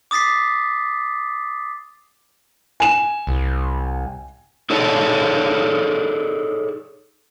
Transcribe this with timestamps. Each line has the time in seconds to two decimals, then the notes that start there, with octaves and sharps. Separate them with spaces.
0.11 D6 D#6 A6 B6 C7
2.80 G#5 E7
3.27 C2
4.70 D#4 G#4 A4 C#5 D5 A5